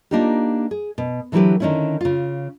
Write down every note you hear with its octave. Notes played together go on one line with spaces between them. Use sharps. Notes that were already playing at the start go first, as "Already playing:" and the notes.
A#3 D4 D#4 F4 G4
G#4
B2
D3 E3 F#3 E4 G4 B4
D3 D#3 F3 C#4 D#4 E4
C#3 F4